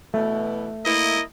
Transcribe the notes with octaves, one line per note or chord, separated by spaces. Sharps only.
B2 E3 A3
A#3 E4 D#5